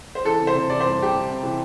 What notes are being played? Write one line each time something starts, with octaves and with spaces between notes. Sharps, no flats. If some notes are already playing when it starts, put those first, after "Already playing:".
C5
E3 A4
C3
C5
C3
E3 D5
C2 C5
C2 G4
C2
C3
E3